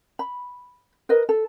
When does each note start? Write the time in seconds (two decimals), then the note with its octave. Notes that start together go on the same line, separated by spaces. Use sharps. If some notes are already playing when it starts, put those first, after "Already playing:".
0.19 B5
1.09 A#4 B4 D#5
1.29 A4